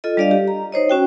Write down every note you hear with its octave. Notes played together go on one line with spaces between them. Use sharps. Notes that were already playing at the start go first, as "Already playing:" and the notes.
F4 A4 D#5
G3 D4 D5 D#5 F5
G4
A#5
D#4 C5 C#5 D#5
C#4 F#4 G5